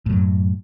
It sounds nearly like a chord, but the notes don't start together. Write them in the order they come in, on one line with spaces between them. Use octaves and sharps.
A2 F#3 F#2